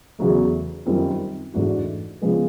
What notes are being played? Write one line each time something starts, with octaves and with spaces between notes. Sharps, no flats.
E2 C#3 F#3 A3
F#2 D#3 G3 C4 F4
G#2 E3 A3 D4 F#4
C#3 F3 G#3 B3